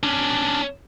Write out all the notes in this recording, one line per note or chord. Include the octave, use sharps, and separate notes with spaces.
C#4 D4